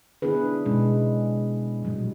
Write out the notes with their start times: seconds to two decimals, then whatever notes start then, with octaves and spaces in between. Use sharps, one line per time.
0.22 B3 D4 E4 G#4 B4
0.65 B2 G#3 C#4
1.83 A#2 F#3 G3